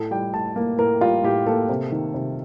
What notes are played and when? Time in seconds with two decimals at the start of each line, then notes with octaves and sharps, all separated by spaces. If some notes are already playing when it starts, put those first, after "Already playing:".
Already playing: A2 A4
0.11 G3 G5
0.34 A2 A5
0.56 A#3
0.79 A2 A#4
1.01 G3 F4
1.23 A2 G4
1.47 A#3 A4
1.69 C3
1.92 D#3
2.14 C3